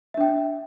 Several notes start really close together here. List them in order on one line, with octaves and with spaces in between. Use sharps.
E5 D4 G5